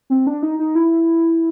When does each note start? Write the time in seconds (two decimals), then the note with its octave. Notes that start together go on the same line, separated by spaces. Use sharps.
0.10 C4
0.27 D4
0.43 D#4
0.59 D#4
0.75 E4